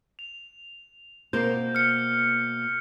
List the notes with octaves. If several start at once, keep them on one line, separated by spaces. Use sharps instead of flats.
F7
B2 A#3 C5 G6
F6 C#7